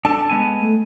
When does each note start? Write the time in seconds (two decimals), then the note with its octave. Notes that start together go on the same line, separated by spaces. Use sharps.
0.05 D4 A4 A5
0.29 G#3 B3 G#5
0.60 A3